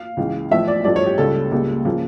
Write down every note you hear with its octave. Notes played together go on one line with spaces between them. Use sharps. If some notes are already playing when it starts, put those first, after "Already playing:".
Already playing: F5
C#2 C#3 E3
A1 A2 F3 E5
D5
A1 G2 F3 A3 D5
C#5
G4
C#2 C#3 G3 A4
C#2 C#3 G3 A#3
C#3 F3 A#3